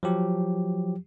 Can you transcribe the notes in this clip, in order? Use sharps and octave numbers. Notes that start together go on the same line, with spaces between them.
F3 F#3 G4